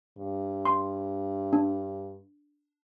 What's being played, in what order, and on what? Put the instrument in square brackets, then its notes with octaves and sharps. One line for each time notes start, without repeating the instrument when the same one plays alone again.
[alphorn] G2
[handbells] C6
D4